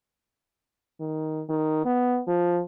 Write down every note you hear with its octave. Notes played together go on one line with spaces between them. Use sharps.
D#3
D#3
B3
F3